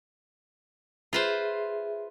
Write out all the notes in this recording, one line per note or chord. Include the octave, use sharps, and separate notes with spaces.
F4 G#4 B4 C5 E5